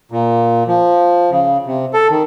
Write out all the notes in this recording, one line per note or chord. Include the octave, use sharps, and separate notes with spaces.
A#2
F3
C#3
C3
A4
D#3